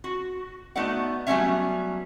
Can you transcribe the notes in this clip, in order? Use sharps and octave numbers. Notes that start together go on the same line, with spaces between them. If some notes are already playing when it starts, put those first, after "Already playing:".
F#4
A3 B3 D#4 F#4 D5 F#5
F#3 G3 A3 B3 C#4 E5